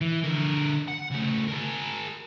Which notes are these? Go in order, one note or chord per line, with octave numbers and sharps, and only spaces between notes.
E3
D3 A#4
F#5
C#3 A3
G#4 A#4